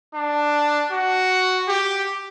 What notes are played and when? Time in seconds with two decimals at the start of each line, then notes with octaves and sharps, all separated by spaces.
0.15 D4
0.92 F#4
1.69 G4